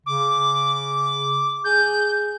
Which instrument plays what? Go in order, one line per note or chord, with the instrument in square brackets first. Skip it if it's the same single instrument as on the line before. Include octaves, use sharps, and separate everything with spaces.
[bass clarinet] C#3 [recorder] D6
[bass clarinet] G#4 [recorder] G6